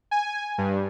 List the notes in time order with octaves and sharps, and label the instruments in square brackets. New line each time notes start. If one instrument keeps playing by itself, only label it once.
[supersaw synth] G#5
G2